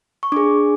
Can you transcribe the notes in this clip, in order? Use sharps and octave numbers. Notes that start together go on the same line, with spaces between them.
C#6
D4 G#4 D6